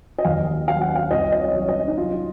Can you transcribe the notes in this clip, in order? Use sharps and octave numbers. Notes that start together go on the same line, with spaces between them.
D#5
D#2 F5
F#3 F5
F#5
F5
C2 D#5
D#5
C#5
F#3
C#5
D#5
D#4
F#3 F4